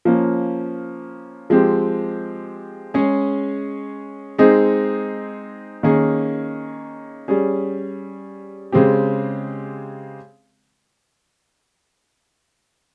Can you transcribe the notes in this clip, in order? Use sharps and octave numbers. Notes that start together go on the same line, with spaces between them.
F3 A#3 C#4
F3 G#3 C4 G4
G#3 C#4 G#4
G#3 C4 D#4 G#4
D#3 A#3 C#4 G#4
G3 C#4 G#4
C#3 G#3 C4 G4